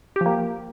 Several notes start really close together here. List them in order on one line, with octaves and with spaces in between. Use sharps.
G4 F3 A#3